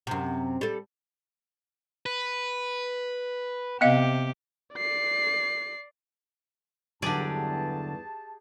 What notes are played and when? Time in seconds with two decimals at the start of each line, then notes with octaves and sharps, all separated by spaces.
0.07 F#2 C3
0.61 G3 A4
2.06 B4
3.81 C3 B3 G4 D#5 F5
4.75 D5 C7
7.02 E2 G2 D3 F#3 G4 G#4 D5 A5